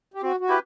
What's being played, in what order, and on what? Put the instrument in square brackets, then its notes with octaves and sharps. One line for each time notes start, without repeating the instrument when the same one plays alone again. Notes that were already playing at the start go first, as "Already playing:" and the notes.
[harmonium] G4
[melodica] C4 [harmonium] F#4
[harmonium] F#4
[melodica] E4 G4 B4